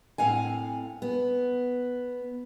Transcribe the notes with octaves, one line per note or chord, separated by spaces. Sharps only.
A2 C4 F5 F#5 G#5
B3